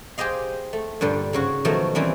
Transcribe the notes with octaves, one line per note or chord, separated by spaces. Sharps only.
G4 G#4 C5 D#5 F5
A3
G2 A#2 D3 G3
G#2 C#3 F#4
B2 D#3 F3 F#3 A3
E3 G3 A#3 C4 C#4